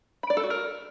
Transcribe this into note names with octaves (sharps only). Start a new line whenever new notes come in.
B5
D5
A4
F#4
A#4